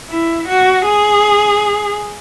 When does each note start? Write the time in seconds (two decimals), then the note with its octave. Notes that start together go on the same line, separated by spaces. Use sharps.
0.09 E4
0.48 F#4
0.86 G#4